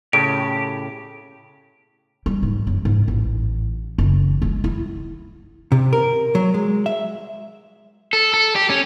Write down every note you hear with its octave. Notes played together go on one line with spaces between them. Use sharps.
A2 C#3 G4 D7
G3
G#2
F#2
G#2
A1
F#1
G#3
E4
C3
A#4
F#3
G#3
E5
A4
A4
G4
C#4